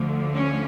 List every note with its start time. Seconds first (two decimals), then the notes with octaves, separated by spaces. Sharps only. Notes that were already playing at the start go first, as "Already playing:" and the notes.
Already playing: D2 D3 F3 A3
0.34 C#4